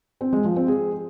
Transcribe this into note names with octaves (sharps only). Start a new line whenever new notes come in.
C4
G#3
F3
C4
G#4